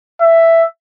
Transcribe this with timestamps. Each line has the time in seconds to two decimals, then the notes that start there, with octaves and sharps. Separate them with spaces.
0.21 E5